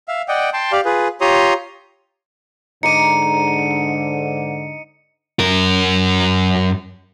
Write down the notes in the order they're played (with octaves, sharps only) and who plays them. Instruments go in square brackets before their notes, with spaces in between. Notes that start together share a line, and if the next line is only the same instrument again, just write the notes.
[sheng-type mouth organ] E5 F5
D5 D#5 F#5 G5
G5 A5 C6
G4 D5 F5
F4 G#4 B4
F4 G4 C#5 A#5 C6 D#6
[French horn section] G#2 D3 [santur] D#4 D6 [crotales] C#7 D#7
[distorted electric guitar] F#2 A#4